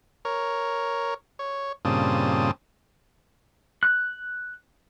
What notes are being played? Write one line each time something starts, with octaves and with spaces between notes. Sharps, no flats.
A#4 C#5
C#5
G2 A#2 C#3 C4 A5 D#6
F#6